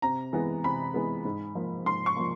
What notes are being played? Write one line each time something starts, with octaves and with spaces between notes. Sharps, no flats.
C3 A#5
E3 G#3 B3
C3 B5
E3 G#3 B3
G#2
F3 A#3
G#2 C6
C#6
F3 A#3